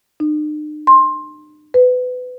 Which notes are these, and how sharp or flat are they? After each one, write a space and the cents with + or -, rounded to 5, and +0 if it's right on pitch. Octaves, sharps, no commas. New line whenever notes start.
D#4 -45
C6 +15
B4 +25